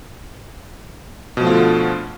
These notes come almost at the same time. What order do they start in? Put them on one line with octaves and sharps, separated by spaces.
B2 F3 A3 F4 D3